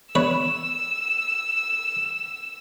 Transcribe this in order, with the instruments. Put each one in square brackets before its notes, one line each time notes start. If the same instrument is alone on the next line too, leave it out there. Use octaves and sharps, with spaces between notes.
[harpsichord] B4 C#5 [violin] E6